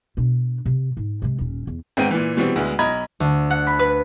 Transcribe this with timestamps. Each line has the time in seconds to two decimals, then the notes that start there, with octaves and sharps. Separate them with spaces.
0.17 B2 D4
0.66 C3
0.97 G#2
1.22 C3 G#3
1.39 D#1 C#4
1.67 E2
1.97 G#1 G#2 B3 C4 G5 D#7
2.11 A#2 E3
2.37 B2 E3 G3 C4
2.56 D2 G#3 B3
2.79 B1 D#5 A#5 B5 G#6
3.20 D2
3.50 F#5
3.67 B5
3.79 B4